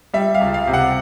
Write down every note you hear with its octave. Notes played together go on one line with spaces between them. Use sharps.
G3 E5
F5
C#2
F5
C3
F#5